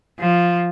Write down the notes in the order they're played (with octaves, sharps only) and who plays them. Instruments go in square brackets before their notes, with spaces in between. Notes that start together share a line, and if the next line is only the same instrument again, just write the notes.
[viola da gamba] F3